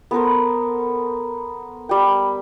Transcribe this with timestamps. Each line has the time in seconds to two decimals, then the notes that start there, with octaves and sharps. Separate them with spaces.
0.11 B3 A4 A#4 C5
1.89 G3 G5